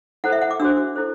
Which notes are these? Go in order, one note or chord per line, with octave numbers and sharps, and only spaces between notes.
E4 A4 C5 F#5
E5
F#5
D6
D4 F#4 C5 E6
E4 A4 C5